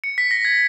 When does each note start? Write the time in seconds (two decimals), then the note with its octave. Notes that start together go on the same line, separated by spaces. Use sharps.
0.04 C#7
0.18 B6
0.31 A#6
0.45 G#6